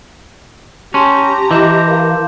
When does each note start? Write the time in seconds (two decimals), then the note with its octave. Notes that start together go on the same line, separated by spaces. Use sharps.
0.94 C#4 G4 A5 A#5 C6
1.51 E3 D#5 D6 G6 E7
1.87 A#4 F5